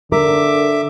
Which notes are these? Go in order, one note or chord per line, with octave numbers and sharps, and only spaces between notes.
D3 A#4 E5 D6